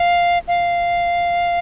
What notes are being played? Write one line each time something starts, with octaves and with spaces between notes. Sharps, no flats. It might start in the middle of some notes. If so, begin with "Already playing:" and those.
Already playing: F5
F5